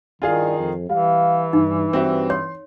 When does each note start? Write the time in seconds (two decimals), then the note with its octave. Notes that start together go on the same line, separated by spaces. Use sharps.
0.22 G2 D#3 E4 F4 G#4 D5 F5
0.58 F2
0.89 E3 G3 F5
1.53 G2 D#4
1.93 G2 C4 F#4 E5
2.30 C#5 C6